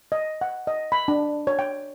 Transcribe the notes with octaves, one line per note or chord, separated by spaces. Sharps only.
D#5
F#5
D#5
B5
D4
C#5
G5